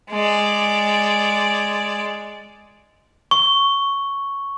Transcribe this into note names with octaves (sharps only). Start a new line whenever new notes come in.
G#3 D5
C#6